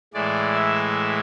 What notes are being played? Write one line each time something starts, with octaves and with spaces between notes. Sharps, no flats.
A2 E3 G#3 D5
E5